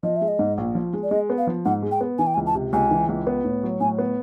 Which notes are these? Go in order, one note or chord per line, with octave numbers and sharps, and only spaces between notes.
F3 D#5
E5
G#3
D#5
G#2
A#1
F3
G#3
D5
G#3 D#5
B3
F5
F3
G#2 F#5
G#3
G5
B3
E3 G#5
G5
G#5
C#2
A5
C3
C#2 G#5
E3
C#2
B3
A2
F#3
A2 G#5
B3